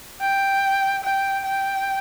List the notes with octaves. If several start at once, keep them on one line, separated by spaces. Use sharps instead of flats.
G5
G5
G5